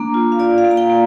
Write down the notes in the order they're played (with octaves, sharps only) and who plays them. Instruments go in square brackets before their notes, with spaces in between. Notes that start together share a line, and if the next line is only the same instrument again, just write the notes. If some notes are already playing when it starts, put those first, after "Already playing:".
Already playing: [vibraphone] A#3 D4 A#5
F4
F5
F4 D5
F5
A#3
A#5
G5
A#3